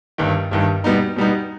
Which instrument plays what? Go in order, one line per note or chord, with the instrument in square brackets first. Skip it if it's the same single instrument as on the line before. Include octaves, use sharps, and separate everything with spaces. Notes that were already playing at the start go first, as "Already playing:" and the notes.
[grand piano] G1 G2 D#3
G1 G2 D#3
B2 G3 B3 D#4
B2 G3 B3 D#4